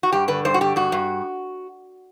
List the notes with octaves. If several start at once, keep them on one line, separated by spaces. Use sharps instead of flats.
F#4
G2 G4
D3 B4
G2 C5
F#4
D3 G4
G2 F#4
G2